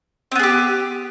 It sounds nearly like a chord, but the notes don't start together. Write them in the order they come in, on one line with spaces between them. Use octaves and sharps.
C4 B3 G#4 G4